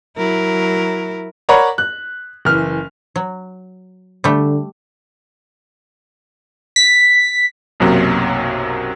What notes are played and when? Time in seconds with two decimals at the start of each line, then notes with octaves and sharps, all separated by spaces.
0.17 F#3 E4 A#4
1.49 A#4 C#5 D5 F#5 A#5 B5
1.78 F#6
2.45 F#1 E3 F6
3.16 F#3
4.24 D3 G3 A3
6.76 B6
7.80 B1 F#2 C3 F#3 A#3